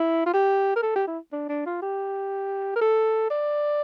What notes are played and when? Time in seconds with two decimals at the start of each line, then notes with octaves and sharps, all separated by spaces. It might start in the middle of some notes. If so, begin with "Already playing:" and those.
Already playing: E4
0.26 F4
0.34 G4
0.76 A#4
0.83 A4
0.95 G4
1.07 E4
1.32 D4
1.49 D4
1.66 F4
1.82 G4
2.76 A#4
2.81 A4
3.30 D5